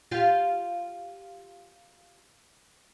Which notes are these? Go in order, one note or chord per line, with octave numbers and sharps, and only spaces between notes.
F4 G4 F5